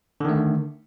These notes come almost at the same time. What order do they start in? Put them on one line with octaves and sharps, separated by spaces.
D3 D#3 A3